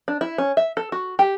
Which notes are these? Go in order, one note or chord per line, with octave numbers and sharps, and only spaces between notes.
D4
E4
C#4
E5
A4
F#4
G4